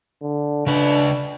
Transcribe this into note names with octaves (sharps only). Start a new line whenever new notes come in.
D3
C#3 D4 B4